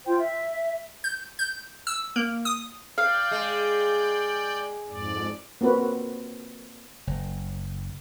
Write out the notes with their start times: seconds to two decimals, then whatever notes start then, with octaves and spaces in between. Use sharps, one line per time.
0.05 F4 C5 G5
0.18 E5
1.04 G6
1.39 G6
1.87 E6
2.16 A#3
2.45 D#6
2.98 D5 F5 G5
3.31 G#3
4.88 F2 G#2 D5
5.61 A#3 C4 F#4 B4
7.07 F#1